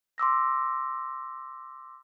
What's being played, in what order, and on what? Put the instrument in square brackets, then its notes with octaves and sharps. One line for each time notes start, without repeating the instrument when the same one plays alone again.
[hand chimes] C6 D6 E6 A#6